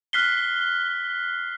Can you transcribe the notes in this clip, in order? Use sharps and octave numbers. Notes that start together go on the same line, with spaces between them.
F6 F#6 B6 C7 G7